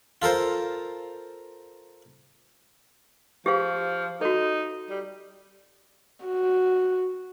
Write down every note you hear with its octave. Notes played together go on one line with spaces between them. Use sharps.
F4 A4 A#4 C5
F3 G4 G#4 F5
D#4 F#4 A4
G3
F#4